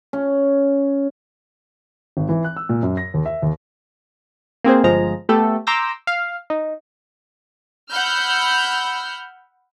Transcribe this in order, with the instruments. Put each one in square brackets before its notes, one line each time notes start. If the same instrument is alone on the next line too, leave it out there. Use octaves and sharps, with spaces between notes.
[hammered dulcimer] C#4
[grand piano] G#1
E3
F#6
E6
A#2
F#2
A#6
D#2
E5
D#2
[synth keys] A#3 C4 G#4 C5
G1 F3 G#3 G#4 A#5
A3 B3 G4 A4
A#5 C6 D6 E6 G6 A#6
F5
D#4
[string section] F#5 B5 E6 F6 G6